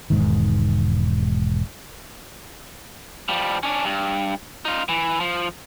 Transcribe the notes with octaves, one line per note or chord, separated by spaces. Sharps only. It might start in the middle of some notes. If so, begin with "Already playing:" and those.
E1 G#2 D#3
F3 G3
C#4 D4
G2
D#4 F4
E3
F3